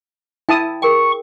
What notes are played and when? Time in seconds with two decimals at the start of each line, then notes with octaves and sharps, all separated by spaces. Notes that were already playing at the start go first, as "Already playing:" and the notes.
0.49 E4 G5 A5 D#6
0.82 G#4 A#4 G5 C#6